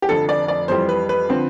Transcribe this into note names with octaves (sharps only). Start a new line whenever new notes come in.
G4
F1 F2 D3 A4
D5
D5
F2 E3 G3 C5
B4
B4
D3 F3 C4